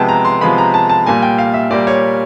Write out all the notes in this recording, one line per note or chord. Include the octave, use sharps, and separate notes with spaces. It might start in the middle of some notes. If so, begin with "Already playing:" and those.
Already playing: C3 F3 G#3 B3 G5 A5
A#5
C6
C3 F3 G#3 B3 B5
A#5
A5
A5
A#2 G3 A#3 G#5
G5
F5
E5
A#2 G3 A#3 D5
C#5